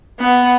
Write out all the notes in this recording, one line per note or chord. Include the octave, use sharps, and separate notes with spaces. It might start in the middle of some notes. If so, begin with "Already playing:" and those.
B3